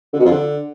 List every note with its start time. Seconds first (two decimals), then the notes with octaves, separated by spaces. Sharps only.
0.13 D3
0.19 B2
0.25 F2
0.31 D3